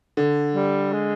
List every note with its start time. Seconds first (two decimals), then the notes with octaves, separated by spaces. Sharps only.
0.17 D3
0.54 G3
0.92 G#3